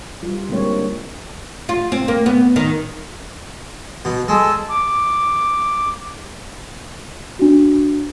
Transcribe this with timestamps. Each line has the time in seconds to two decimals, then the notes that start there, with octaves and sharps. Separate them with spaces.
0.23 G3 F4
0.49 D3 G3 G#3 A#3 C4 C#5
1.69 F4
1.92 C4
2.08 A#3
2.26 B3
2.56 D#3
4.05 B2
4.29 G#3 A4
4.70 D6
7.39 D4 F#4